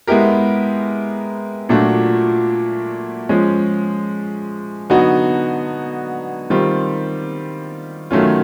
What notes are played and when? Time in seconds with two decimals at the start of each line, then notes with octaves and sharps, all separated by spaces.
0.07 G#3 B3 E4 G4 A#4
1.69 A#2 F#3 A3 D4 F#4
3.29 F3 G#3 C#4
4.90 D3 F#3 B3 D#4 F#4
6.50 D#3 G3 C4 F4
8.11 D#3 F#3 A3 C#4 F4